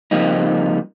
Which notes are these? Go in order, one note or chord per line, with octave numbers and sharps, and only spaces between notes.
C#3 F3 G3 A#3 C4 D#4